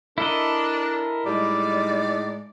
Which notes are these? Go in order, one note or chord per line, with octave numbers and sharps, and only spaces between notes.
D4 E4 A4 A#4 D#5
A2 G3 G#3 D#4 D5